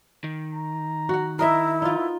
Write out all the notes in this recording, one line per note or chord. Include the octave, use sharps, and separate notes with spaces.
D#3
A#5
F#4 F#5
E4 A#4 D#5 E5 A#5
B3 D#4 F4